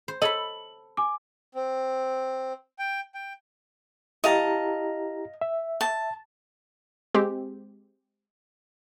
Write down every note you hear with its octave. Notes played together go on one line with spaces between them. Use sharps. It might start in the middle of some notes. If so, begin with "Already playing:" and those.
C5
A4 C#5 D#5 B5 F#7
G#5 D6
C4
G5
G5
E4 G4 D#5 F5 A5 A#5
E5
A5
G#3 C4 G4